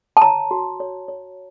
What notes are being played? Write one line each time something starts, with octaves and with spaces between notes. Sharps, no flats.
A5
C#5 A#5
F#4
C#5
C#5